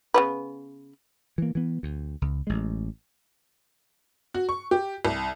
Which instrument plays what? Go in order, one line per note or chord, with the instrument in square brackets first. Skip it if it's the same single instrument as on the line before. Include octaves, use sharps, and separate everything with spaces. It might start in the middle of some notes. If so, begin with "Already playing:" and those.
[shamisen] C#3 B3 B4
[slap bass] E3 A#3
E3 B3
D2
C#2
A1 G#3
[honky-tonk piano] F#4
C#6
G4
C2